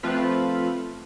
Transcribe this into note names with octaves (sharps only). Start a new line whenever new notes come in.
F3 A3 C4 F4 B4